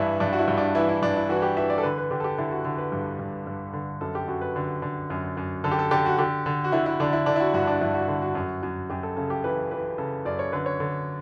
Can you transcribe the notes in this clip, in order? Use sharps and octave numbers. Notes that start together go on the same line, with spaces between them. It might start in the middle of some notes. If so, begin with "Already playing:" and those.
Already playing: G2 E3 D4 E4
G2 D4
F#4
E4
G2
D4
E3 E4
E4
G2 D4
E4
E3 F#4
G4
E3 E5
D5
A4
D3 B4
B4
D3 G4
A4
G4
D3 E4
F#4
D3
B4
G2
G2
G2
D3
F#2 A4
G4
F#2 F#4
B4
D3
D3
F#2
F#2
D3 A4
G4
A4
D3 G4
F#4
D3 G4
D3
F#4
D3 E4
E4
D3 D4
E4
D3 D4
E4
F#4
G2 F#4
D4
G2 E4
F#4
D3
F#4
F#2
F#2
F#2 G4
A4
C#3 A4
G4
E3 B4
E3 B4
C#3 A4
F#2 D5
C#5
D3 B4
C#5
D3